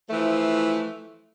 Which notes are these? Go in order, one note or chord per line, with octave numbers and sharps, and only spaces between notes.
E3 F3 A3